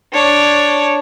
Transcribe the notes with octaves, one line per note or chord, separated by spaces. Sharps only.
D4 C#5